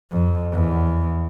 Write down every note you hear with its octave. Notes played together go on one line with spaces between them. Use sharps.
F2
E2